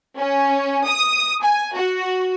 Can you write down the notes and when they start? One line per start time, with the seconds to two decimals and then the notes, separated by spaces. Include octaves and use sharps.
0.17 C#4
0.87 D#6
1.43 G#5
1.75 F#4